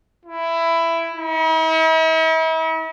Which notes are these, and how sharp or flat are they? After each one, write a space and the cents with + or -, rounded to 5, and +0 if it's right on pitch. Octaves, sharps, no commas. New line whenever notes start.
E4 +10
E4 -45